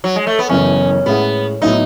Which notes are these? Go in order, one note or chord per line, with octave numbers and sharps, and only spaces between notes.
F#3
G#3
A3
B3
F#1 F#2 E3 B3 C#4 E4
A2 G#3 B3 C#4 E4 G#4
A2 F#3 B3 D#4 E4